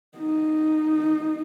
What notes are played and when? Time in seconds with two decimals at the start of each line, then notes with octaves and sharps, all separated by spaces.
0.18 D#4